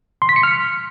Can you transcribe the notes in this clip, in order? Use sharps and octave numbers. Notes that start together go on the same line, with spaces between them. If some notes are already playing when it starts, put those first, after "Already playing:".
C6
B6
C#7
F6